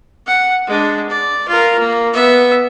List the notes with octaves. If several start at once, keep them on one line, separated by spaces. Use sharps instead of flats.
F#5
G#3 D4
D5
F4 A#4
A#3
B3 E5